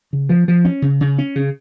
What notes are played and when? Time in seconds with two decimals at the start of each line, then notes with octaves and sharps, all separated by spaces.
0.13 C#3
0.29 F3
0.48 F3
0.65 C#4
0.82 C#3
1.01 C#3
1.18 C#4
1.36 C#3